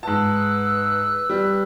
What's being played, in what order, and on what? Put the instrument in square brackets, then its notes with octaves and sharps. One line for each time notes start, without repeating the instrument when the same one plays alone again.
[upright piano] G#2 A5 [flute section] B4 E6 F#6
[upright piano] G3